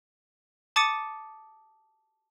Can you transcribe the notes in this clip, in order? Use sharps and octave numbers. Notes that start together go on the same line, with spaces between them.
A5 D6 D#6 A6 C#7 D#7